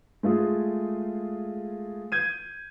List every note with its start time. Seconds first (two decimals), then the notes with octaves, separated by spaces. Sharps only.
0.23 G#3 A3 F4 G#4
2.12 G6 G#6 D#7